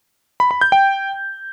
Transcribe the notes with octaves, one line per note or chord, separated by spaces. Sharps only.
B5
B5
G6
G5